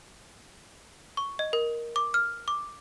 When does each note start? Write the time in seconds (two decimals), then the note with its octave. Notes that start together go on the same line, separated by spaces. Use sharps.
1.17 C#6
1.39 D#5
1.53 A#4
1.96 D6
2.14 F6
2.48 D6